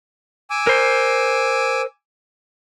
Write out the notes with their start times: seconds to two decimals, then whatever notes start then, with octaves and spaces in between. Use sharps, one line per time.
0.50 G#5 D6 E6
0.67 A#4 C5